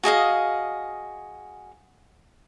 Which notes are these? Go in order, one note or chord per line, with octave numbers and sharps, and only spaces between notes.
F#4 G#4 D#5 F5